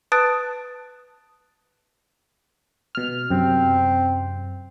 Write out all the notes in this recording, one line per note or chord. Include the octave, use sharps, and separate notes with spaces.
B4 A5 D#6 F#6 A6 D7
B2 F6
F#2 C3 C4